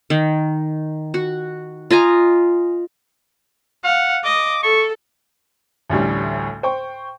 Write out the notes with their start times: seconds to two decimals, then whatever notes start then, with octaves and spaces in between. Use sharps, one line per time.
0.10 D#3
1.14 F#4
1.90 F4 D#5 G#5 A#5
3.84 F5 F#5
4.24 D#5 D6
4.63 A4 C#6
5.90 A1 D2 A2 G3
6.63 C5 G5 C#6